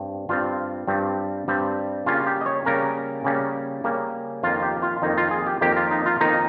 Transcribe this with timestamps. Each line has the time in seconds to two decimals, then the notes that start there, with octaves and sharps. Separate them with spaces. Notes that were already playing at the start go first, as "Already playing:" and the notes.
Already playing: G2 G3 C4
0.29 G2 G3 C4 F4
0.87 G2 G3 C4
1.48 G2 G3 C4
2.06 C#3 G3 A#3 C#4 F4
2.27 G4
2.41 D#5
2.46 C#5
2.65 C#3 G3 A#3 C#4 A#4
3.24 C#3 G3 A#3 C#4
3.84 C#3 G3 A#3 C#4
4.43 F2 D#3 A#3 F4
4.63 G4
4.82 F4
5.02 F2 D#3 A#3 D#4
5.17 F4
5.31 G#4
5.47 G4
5.61 F2 D#3 A#3 G4
5.76 F4
5.91 D#4
6.06 F4
6.21 F2 D#3 A#3 D#4